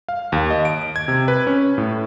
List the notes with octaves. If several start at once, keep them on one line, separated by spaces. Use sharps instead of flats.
F5
D#2
D#5
D7
G#6
C3
B4
C#4
A2